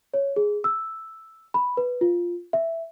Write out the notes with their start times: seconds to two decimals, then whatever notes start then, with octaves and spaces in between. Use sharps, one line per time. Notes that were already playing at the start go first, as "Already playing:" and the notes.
0.14 C#5
0.36 G#4
0.64 E6
1.54 B5
1.77 B4
2.01 F4
2.53 E5